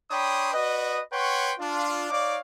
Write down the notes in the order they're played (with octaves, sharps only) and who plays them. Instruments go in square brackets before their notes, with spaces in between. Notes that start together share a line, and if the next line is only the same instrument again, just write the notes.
[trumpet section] D4 C#5 G5 B5 C6 D#6
F#4 B4 D5 D#5
B4 C#5 F#5 G5 C6 C#6
D4 F4
D#4 C#5 D5 F5 D6